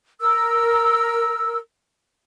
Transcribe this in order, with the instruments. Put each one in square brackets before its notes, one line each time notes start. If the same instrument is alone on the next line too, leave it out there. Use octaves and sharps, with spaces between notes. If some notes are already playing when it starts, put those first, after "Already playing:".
[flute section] A#4 E6